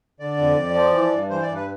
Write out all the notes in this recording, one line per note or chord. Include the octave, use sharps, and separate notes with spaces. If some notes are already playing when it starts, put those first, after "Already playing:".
D3 D5
F2
F2
F3
E3
G2
E3 C5
D5
G2
B4